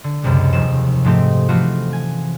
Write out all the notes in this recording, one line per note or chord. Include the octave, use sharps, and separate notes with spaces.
D3
C#2 F#2 C3 G#3
F1 D#2 F3 G#3 E7
G#2 F3 G#3 A3 C4 G4
E3 F3 A3 F4 F#4
G#5